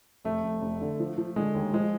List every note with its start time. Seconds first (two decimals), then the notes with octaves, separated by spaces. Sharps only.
0.25 F1 A3
0.43 F1
0.62 F1
0.81 D3
1.00 F3
1.18 F3
1.36 D3 G#3
1.54 D#2
1.73 F3 G#3